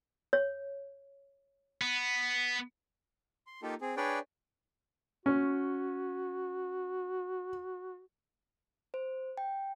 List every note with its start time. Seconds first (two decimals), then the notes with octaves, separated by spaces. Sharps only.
0.33 C#5
1.81 B3
3.47 C6
3.62 A#3 D#4 F4 G4 A4
3.81 C4 G#4
3.97 D4 G#4 B4 C#5 D5 G5
5.26 C#4 F#4
8.94 C5
9.38 G5